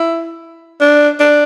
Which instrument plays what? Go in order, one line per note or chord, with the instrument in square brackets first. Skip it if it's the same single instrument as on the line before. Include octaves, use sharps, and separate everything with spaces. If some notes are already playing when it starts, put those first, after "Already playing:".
Already playing: [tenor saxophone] E4
D4
D4